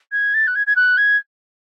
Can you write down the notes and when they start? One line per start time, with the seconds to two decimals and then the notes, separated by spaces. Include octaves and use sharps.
0.12 G#6
0.34 A6
0.47 F#6
0.55 G#6
0.67 G#6
0.76 F#6
0.97 G#6